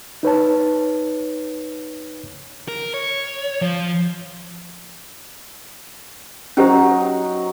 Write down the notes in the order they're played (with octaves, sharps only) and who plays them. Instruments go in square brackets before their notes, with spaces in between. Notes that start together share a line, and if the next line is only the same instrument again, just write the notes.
[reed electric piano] D#4 B4 C#5 A5
[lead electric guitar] A#4
C#5
F3
[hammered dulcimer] F#3 D#4 [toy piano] C#4 G4 C5